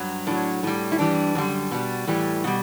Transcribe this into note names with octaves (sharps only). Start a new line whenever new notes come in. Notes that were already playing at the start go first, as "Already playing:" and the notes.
Already playing: G2 F#3
A2 F#3 D4
A2 G3
E4
G2 E3 G3 D4
F#2 D3 G3
B2 G3
A2 E3 G3
B2 G3 F#4